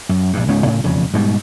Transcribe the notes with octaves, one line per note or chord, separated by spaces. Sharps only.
F#2
A#1 G2
C#2 G#2 F3 C#4
A2 C#3
E1 F2 C#3
G#2 B2 G3